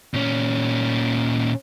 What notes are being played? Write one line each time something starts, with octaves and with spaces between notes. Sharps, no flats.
A#2 C#4